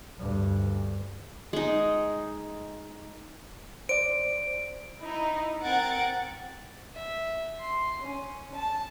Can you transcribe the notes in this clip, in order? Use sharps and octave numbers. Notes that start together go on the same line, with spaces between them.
D2 G2
G#3 D#4
C5 D5 D7
D#4 E4
C4 A#4 F#5 G#6 A6 D7
E5
C6
C#4
A5